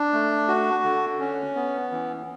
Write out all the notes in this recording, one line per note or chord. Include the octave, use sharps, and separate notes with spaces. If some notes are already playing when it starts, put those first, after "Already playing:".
Already playing: D4
A3
F#4
D3
C#4
B3
E3